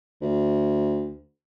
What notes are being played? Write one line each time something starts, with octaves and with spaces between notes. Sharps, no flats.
D2